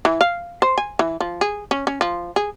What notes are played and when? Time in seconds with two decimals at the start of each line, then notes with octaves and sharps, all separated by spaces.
0.05 E3
0.21 F5
0.62 C5
0.78 G#5
0.99 E3
1.20 F3
1.41 G#4
1.71 C#4
1.87 C#4
2.01 F3
2.36 G#4